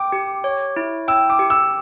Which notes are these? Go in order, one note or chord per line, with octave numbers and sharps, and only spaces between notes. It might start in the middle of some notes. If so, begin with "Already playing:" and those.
Already playing: G5 D6
G4
C#5
E4
G5 E6
D6
G4
E6